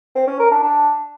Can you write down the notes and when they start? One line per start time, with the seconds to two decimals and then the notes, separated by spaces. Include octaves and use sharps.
0.16 C4
0.27 C#4
0.39 A#4
0.51 D4
0.63 D4